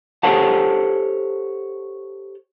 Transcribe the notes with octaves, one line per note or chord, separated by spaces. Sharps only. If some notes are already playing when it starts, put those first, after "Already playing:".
G4 A4 C5 C#5 F#5 A5